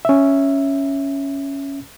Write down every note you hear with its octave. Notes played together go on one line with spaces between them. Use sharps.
C#4 E5